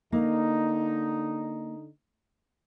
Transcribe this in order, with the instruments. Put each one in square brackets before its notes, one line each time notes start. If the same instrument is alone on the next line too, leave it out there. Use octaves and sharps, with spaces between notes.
[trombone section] D3 D#4 [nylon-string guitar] A#3